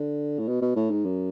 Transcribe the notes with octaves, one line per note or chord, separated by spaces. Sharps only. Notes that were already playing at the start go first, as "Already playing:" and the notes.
Already playing: D3
A2
B2
B2
A2
G#2
F#2